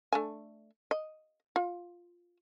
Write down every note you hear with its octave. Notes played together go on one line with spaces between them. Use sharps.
A3 D4 G#5
D#5
F4